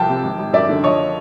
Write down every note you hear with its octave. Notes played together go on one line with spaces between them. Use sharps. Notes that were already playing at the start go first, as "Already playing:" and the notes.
Already playing: C2 F3 G5 A5
C3
G#1
G#1
F#2 D5 E5
D3
F3 C#5 D#5